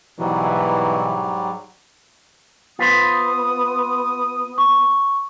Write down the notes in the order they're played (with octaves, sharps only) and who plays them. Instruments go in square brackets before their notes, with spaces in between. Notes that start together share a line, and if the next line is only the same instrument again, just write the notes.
[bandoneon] G#2 F#3 G3 [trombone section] B2 E3
[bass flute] B3 [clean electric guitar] F4 B4 C5 [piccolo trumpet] D#6
[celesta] C#6